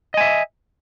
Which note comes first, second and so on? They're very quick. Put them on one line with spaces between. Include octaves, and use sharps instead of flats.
D#5 G#5 E5